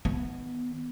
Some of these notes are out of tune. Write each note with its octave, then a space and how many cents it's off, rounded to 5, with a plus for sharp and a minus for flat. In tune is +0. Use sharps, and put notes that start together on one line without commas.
D#3 +0 B3 +0